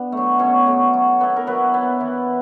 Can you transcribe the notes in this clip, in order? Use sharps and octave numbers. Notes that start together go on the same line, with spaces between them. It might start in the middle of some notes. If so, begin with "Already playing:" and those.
Already playing: B3 D4
F#3 A3
B2 C#4 C#5
F#3 A3
F#3
B3 E4
A#4
F#3 B3 B4
B3 E4
E3